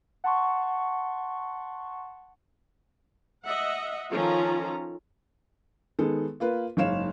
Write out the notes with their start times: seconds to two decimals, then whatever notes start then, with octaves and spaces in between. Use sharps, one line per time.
0.24 F#5 A5 C6 C#6
3.44 D#5 E5 F#5
4.12 D#3 F3 C#4 F4 A4 A#5
5.99 D#3 G#3 B3 A4
6.40 A#3 F4 B4
6.77 F#1 G#2 C#5 F5 E7